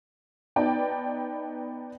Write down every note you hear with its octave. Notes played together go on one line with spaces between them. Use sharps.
B3 D#4 B4 D5 G5 A5